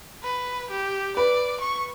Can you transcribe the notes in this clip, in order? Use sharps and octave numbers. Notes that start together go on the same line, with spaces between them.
B4
G4
B4 D5
C#6